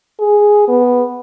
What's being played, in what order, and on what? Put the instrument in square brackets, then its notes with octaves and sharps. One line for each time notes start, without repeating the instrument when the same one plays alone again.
[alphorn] G#4
B3